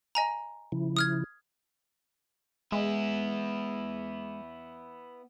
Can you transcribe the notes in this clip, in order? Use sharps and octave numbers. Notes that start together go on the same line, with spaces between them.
D#5 G#5 A#5
C#3 F3 E4
D#6 F6 G#6
G#3 B3 E4